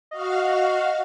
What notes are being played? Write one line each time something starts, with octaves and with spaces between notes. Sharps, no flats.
F#4 D#5 F5